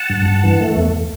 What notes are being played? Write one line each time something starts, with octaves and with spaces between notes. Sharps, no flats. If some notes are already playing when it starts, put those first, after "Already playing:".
Already playing: F#5 A5
G2
G2
E3
A3
E2